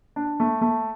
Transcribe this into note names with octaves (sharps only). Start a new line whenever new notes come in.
D4
A3
A3